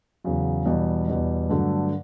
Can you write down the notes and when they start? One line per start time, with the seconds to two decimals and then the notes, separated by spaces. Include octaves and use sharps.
0.24 E2 C#3 F#3
0.66 E2 B2 G3
1.08 E2 B2 G3
1.49 G2 D3 F#3 A3